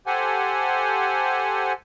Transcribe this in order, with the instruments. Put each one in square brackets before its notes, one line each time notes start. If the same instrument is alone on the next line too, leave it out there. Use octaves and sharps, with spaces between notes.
[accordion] G4 A4 C5 F#5 G#5